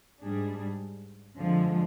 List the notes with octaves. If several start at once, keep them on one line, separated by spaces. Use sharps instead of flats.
G#2 G3 D4 G#4
F2 D3 F3 G#3